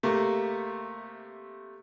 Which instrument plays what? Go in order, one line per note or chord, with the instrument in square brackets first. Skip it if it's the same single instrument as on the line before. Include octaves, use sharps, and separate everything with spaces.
[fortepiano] C3 A3 A#3